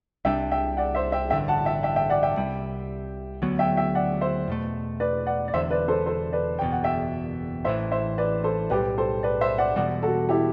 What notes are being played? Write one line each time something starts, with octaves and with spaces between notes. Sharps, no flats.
C2 C3 G3 D4 E5 G5
E5 G5
D5 F#5
C5 E5
E5 G5
A1 G2 D3 E5 G5
F#5 A5
E5 G5
E5 G5
E5 G5
D5 F#5
E5 G5
C2 C3 G3
D2 D3 F#3 B3
E5 G5
E5 G5
D5 F#5
C5 E5
E2 B2 A3
B4 D5
D5 F#5
D5
E1 E2 D3 C5 E5
B4 D5
A4 C5
A4 C5
B4 D5
F#1 E2 B2 G5
F#5
E5 G5
A1 A2 E3 C5 E5
C5 E5
B4 D5
A4 C5
B1 A2 G3 G4 B4
A4 C5
B4 D5
C5 E5
D5 F#5
E1 E2 B2 G3 D5 F#5
F#4 A4
E4 G4